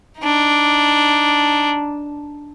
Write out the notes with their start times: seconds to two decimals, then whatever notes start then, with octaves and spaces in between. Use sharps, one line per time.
0.19 D4 D#4